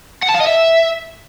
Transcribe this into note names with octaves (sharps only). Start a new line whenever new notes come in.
F#5
A5
F5
D#5
E5